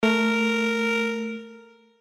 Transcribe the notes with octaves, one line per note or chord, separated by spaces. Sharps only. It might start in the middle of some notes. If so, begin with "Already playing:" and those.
A3 A#4